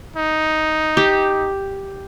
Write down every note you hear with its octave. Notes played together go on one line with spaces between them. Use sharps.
D#4
G4